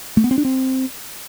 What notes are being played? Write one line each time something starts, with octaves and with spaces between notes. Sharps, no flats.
A3
B3
C4
D4
C4